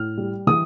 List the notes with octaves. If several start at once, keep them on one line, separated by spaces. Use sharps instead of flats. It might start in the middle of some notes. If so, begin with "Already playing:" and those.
Already playing: A2 F6
G3
E3 D#6